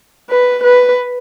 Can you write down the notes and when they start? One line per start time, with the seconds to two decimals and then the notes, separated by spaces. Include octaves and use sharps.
0.30 B4
0.63 B4